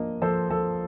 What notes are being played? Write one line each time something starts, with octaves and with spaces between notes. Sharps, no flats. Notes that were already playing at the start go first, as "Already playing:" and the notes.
Already playing: F3 A#3 D4 D#5
F3 A4 C5
F3 A4